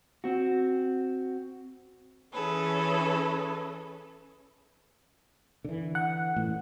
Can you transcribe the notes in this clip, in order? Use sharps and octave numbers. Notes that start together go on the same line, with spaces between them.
C4 F#4
E3 C#4 G#4 A4 B4
D3 E3
F#5
A1 A2